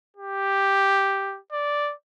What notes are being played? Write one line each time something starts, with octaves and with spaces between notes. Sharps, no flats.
G4
D5